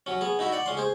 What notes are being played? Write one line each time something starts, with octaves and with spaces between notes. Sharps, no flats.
F#3 C#4
B3 G#4
D#4 E4 F#4 E5
D5 F#5
C#2 C#4 C6
G#4 C5